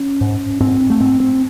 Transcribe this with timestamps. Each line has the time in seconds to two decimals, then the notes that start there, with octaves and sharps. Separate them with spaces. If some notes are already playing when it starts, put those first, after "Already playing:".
Already playing: C#4
0.21 G#2
0.60 G#2 C4
0.90 A3
1.00 G#2 C4
1.20 C4